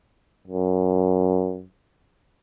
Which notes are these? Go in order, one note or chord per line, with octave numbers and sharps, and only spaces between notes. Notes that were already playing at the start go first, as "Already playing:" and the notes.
F#2